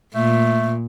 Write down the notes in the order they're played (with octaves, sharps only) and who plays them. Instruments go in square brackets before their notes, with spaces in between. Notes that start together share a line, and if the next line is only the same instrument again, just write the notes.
[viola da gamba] A#2 [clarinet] A3